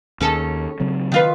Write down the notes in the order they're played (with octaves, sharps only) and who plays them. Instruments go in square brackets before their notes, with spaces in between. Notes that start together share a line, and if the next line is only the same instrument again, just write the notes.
[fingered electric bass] D#2 [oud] C#4 G#4 A4
[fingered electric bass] C#3 F#3 C4
[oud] D#3 F4 B4